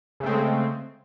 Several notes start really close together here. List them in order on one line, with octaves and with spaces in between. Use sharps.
C#3 A3 C4 G#3